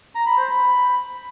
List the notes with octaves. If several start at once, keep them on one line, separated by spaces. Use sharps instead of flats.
A#5
B5
C5
B5